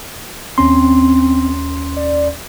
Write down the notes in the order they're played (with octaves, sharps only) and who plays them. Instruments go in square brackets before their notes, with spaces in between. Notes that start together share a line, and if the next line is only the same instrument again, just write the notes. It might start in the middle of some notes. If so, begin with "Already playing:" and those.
[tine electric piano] D#2 C#4 C6 [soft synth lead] C4
[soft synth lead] D5